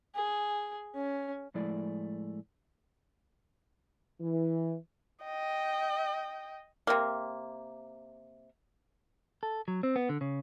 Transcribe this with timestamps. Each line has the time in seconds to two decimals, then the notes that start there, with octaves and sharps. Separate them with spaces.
0.15 G#4
0.95 C#4
1.54 A2 F3 G#3 A3 E4 D5
4.20 E3
5.24 D#5 G5
6.87 C3 A#3
9.43 A4
9.68 F#3
9.83 C4
9.96 B3
10.09 D3
10.21 C#3